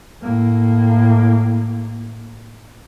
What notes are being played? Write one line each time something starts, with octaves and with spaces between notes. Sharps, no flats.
A2 A#3